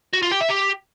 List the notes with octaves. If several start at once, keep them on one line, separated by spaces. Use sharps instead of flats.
F#4
F4
G4
E5
G4